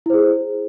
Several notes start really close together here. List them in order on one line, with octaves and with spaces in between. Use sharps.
E4 C5 G#4